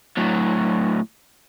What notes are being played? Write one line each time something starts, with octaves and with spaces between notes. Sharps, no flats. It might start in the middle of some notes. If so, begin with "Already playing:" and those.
A2 F#3